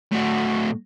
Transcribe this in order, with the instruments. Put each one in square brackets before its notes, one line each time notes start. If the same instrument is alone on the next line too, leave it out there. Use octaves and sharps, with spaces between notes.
[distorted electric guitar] A2 F#4